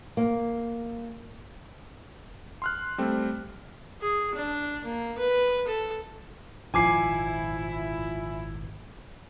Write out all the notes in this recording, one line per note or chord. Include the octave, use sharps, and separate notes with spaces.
A#3
C6 F6 F#6
G3 A3 C4
G#4
D4
A#3
B4
A4
G#1 A#2 F3 E4 G#5 D6 C7